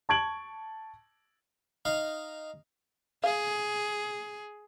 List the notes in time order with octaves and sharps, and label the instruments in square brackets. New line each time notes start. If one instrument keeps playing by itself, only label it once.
[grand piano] A5 C#6 G#6 D7 F#7
[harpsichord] D#4 F5
[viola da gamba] G#4 [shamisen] F5